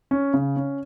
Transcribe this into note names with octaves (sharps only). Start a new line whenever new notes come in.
C#4
C#3
C#4